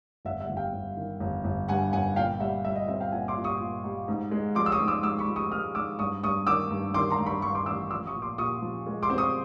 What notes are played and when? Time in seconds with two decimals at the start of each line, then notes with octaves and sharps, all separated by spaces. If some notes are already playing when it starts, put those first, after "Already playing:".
0.25 G1 E5 F#5
0.40 E5 F#5
0.49 G1
0.57 F5 G5
0.73 G1
0.97 D#3
1.20 G1
1.44 G1
1.68 G2 F#5 G#5
1.92 G1 F#5 G#5
2.16 A#2 F5 G5
2.40 G3 E5 F#5
2.64 G3 E5
2.76 D#5
2.88 C4 E5
3.00 F5 G5
3.12 A#2 F#5 G#5
3.28 C6 D6
3.36 A#2
3.44 C#6 D#6
3.60 A#2
3.84 G3
4.08 G#2
4.31 G#3
4.55 F3 C6 D6
4.66 E6
4.72 C#6 D#6
4.80 G#2
4.88 D6 E6
5.03 G#2 D6 E6
5.19 B5 C#6
5.28 F3
5.36 C#6 D#6
5.51 G#3 D#6 F6
5.75 G#2 D6 E6
5.99 G2 C#6 D#6
6.23 G2 C#6 D#6
6.47 D#3 D6 E6
6.70 G2
6.94 D#3 C6 D6
7.10 A#5 C6
7.19 G2
7.26 B5 C#6
7.42 G2 B5 C#6
7.55 C6 D6
7.66 A1 D6 E6
7.91 F3 D6 E6
8.06 C#6 D#6
8.14 A#2
8.22 C6 D6
8.38 A#2 C#6 D#6
8.62 F3
8.87 G#3
9.03 C6 D6
9.10 C4
9.18 C#6 D#6